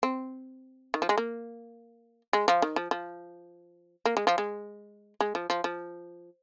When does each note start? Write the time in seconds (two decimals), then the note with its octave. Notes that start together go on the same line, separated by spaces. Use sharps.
0.03 C4
0.94 D#3
1.02 F3
1.09 G#3
1.18 A#3
2.33 G#3
2.48 F3
2.62 D#3
2.76 F3
2.91 F3
4.06 A#3
4.17 G#3
4.27 F3
4.38 G#3
5.21 G#3
5.35 F3
5.50 F3
5.64 F3